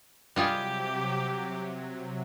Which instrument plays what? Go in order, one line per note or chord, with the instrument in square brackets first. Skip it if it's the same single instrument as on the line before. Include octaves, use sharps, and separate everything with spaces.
[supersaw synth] C3 F#3 [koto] G3 F4 G#4 [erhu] G4